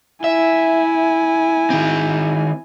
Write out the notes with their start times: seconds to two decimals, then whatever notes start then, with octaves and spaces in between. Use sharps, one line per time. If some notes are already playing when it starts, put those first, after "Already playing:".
0.24 E4 E5 G#5
1.70 D#3 C4